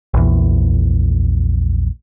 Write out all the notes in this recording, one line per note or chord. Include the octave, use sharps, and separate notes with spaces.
A#1 E2